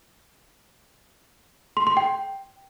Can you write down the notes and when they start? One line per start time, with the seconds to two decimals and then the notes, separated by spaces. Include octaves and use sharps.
1.77 C6
1.87 C6
1.97 G5